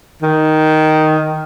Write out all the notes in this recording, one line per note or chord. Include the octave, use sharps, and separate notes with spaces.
D#3